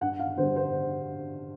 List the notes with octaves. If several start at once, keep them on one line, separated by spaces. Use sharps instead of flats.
G2 F#5
F5
D3 G3 C5
C5